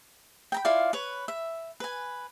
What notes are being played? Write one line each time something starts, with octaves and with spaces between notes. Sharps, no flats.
G5 A#5 B5
E4 F4 D5 F5
B4 C#5
E5
B4 G#5